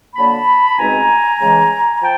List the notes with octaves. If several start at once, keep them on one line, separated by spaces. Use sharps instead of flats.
D3 F#3 A#3 A5 B5
C#2 B2 G#3 C4 D#4 G#5 A#5
C#3 E3 G#3
F3 G5 A5